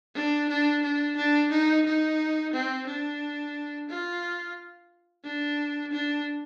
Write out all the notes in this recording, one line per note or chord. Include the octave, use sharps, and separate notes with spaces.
D4
D4
D4
D4
D#4
D#4
C4
D4
F4
D4
D4